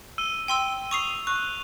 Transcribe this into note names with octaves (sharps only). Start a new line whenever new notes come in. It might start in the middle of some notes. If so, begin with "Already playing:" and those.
E6 D#7 G7
G5 C6 E6 D#7
C#6 D#6 C7 D#7 F7
C#6 F#6